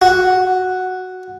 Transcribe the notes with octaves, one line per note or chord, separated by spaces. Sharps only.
F#4